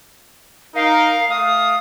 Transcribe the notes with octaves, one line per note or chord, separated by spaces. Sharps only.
D#4 A#4 F5
A3 F5 D#6